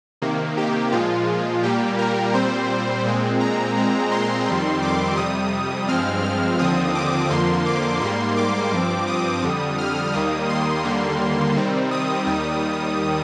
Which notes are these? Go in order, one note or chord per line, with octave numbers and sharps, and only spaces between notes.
C3 D#3 A#3
G4
A#2 F3 G#3 F4
A#2 G3 A#3 G4
A#4
A#2 G3 C4 C5
A#2 G#3 C4
A#5
A#2 G#3 C4
C6
F2 D#3 G3 C4
D6
F2 C3 G3 D#6
G2 F3 G#3 C4 F6
F6
D#2 D3 F3 C4 D#6
D6
F2 D3 F3 A#3 C6
D6
G#2 G3 A#3 C6
D6
G2 F3 C4
D#6
F2 D3 G3
F6
D#2 D#3 G3 A#3 D#6
C6
D#2 D3 G3 A#3
C3 D#3 G3 C4
D#6
D#2 D#3 G3